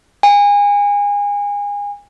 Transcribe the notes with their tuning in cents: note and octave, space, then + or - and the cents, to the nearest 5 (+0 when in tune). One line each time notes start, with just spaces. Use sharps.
G#5 -30